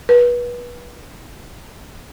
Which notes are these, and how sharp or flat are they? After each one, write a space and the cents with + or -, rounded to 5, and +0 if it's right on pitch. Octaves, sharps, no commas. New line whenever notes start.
B4 -30